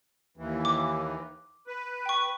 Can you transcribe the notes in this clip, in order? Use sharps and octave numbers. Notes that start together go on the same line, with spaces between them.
D#2 E3
D6
B4
G5 C#6